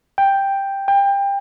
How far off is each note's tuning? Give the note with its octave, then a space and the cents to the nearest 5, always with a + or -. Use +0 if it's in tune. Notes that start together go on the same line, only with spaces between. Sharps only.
G5 +5
G5 +25